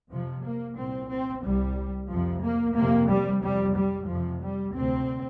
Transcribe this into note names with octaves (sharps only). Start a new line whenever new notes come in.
F2 C3 F3
A#3
C2 A#2 C4
C4
C2 C3 G3
F2 C3 F3
A#3
F2 C3 A#3
G3
F2 C3 G3
G3
F2 C3 F3
G3
D2 C3 C4